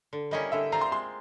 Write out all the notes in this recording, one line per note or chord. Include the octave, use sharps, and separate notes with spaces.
D3
G3 A#3 C#4 E4 D#5
D3 E5
G3 C4 F4 A#5
C6
G#3 C6